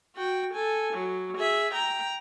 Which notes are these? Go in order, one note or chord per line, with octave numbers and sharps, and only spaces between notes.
F#4 G5
A4 G#5
F#3
G#4 E5
G5 A#5